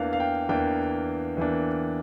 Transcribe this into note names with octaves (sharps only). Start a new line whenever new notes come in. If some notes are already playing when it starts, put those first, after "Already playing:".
Already playing: E2 E3 A#3 D4 F5
F5
G5
E2 E3 A#3 D4 G5
E2 E3 A#3 D4